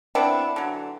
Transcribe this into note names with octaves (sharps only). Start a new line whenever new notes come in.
B3 C4 D4 E4
D3 E3 F#3